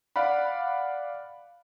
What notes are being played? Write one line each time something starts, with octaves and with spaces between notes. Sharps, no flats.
D5 F5 F#5 B5